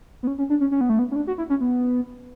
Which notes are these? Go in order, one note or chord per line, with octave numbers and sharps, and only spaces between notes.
B3
C#4
C#4
D4
C#4
C#4
B3
A3
B3
C#4
D4
F#4
E4
C#4
B3